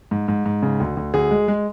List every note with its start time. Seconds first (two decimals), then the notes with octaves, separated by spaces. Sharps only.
0.11 G#2
0.28 G#2
0.46 G#2
0.63 C#3
0.80 D2
0.97 D2
1.14 D2 G#4
1.31 G#3
1.48 G#3